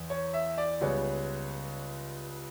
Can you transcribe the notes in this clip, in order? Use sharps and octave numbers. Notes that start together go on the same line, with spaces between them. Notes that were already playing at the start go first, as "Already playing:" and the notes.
Already playing: E2
C#5
E5
D5
C#2 C#3 G3 B3 C#5